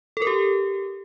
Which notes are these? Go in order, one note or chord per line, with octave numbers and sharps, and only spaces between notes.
A4
A#4
G4